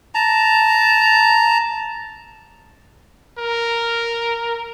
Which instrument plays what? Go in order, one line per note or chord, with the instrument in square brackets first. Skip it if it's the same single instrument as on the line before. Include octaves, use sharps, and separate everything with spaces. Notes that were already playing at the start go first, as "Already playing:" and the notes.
[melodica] A5 A#5
[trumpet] A#4